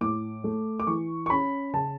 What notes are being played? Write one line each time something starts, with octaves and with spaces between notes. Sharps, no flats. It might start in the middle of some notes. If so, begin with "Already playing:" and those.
A2 D6
A3
D6
E3 C#6
C#6
C#4 B5
C#3 A5